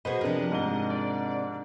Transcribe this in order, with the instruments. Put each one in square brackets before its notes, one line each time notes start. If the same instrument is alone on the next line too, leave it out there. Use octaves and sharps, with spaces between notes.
[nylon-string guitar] B2 G#4 [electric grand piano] B4 C5 B5 [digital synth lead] D#5
[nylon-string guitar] C3 F3 [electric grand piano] D4 A#4
[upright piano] G#2 G7
[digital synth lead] D5